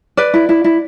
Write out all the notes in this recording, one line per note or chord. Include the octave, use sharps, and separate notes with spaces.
B4 D5
E4
E4
E4